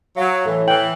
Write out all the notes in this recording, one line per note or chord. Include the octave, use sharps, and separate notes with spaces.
F#3 F5
A2 E3
E3 G5 F#7